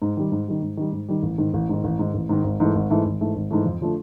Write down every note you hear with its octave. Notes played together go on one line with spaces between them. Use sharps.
G#2
D#3 G3
G#2
D#3 G3
G#2
D#3 G3
G#2
D#3 G3
A1
G#2 D#3
A1
G#2 D#3
A1
G#2 D#3
A1
G#2 D#3
G#1
G#2 E3 A3
G#1
G#2 E3 A3
G#1
G#2 E3 A3
G#1
G#2 E3 A3
F2
D3 F3 A3 D4